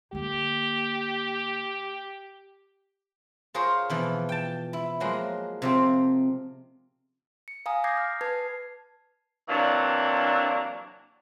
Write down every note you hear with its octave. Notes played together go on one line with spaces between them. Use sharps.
D3 A#3 G4
F4 G#4 A#4 C5 C#5 F5
B2 E3 F3
G5 A5
E4
F3 F#3 G#3 A#3
C3 F3 C4
C#7
F5 G#5 A#5 D#6
D6 D#6 G6 G#6 A#6 C7
F6
B4 A5 G#6 C7
C3 E3 F#3 A#3 D4